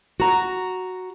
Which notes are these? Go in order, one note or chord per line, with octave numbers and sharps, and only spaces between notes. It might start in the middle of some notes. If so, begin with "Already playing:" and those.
F#4 A#5